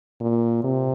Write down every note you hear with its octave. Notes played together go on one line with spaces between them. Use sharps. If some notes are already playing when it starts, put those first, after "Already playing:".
A#2
C3